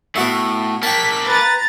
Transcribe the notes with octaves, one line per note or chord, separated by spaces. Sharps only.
A2 B3 F#4 E5
A#3 D4 G5 A5 B6
B4 A#5 A6